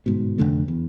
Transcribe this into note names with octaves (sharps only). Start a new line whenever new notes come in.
G1 G#2 B2
F1 F2 D3 A3
E2